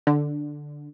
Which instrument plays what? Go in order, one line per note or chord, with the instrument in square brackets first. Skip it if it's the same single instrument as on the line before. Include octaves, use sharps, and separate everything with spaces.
[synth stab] D3